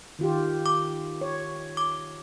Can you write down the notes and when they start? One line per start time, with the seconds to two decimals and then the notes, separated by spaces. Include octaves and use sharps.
0.19 D#3 F4 G4
0.66 D6
1.21 C#5
1.77 D6